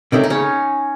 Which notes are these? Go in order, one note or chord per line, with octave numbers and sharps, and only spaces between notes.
C3 D#3 A3 C#4
D#4
C#3 C#4